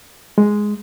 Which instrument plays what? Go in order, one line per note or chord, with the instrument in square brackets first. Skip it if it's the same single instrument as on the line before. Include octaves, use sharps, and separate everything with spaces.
[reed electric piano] G#3